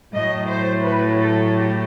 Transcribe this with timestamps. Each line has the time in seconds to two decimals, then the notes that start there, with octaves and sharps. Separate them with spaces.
0.12 A2 F#3 A3 D#5
0.48 C5
0.84 B4
1.20 A4
1.56 G4